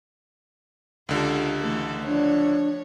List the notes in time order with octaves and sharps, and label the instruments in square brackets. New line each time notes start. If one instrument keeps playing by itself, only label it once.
[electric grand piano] C#2 D3 [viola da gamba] F4 G4 A4
[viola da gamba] E3 A3 A4
[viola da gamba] F3 C#5 [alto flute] D4